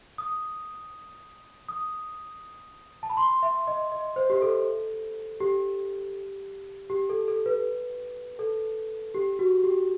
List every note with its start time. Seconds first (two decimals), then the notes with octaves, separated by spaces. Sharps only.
0.18 D#6
1.69 D#6
3.03 A5
3.10 B5
3.17 C6
3.43 E5
3.67 D#5
3.92 D#5
4.16 C5
4.30 G4
4.42 A4
5.41 G4
6.90 G4
7.10 A4
7.28 A4
7.46 B4
8.39 A4
9.14 G4
9.39 F#4
9.64 G4